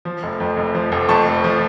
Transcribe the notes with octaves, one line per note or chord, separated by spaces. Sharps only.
F3
F1
F2
F1
F3
F1
F2 A5 C#6
F1
F3